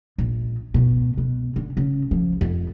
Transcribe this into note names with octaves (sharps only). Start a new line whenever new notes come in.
A#1
B2
B2
D3
C#3
F3
F2